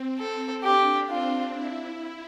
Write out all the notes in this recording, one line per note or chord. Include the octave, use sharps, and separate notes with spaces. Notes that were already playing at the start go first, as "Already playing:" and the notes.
Already playing: C4
A4
D4 G4
C4 F4
E4